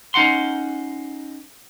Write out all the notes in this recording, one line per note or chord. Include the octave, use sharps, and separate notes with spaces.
C#4 D#4 F5 F#5 C6